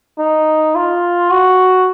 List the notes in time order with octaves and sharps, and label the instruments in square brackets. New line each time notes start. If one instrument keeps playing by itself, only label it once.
[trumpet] D#4
F4
F#4